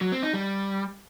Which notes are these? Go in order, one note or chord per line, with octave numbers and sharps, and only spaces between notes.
F#3
C4
D#4
G3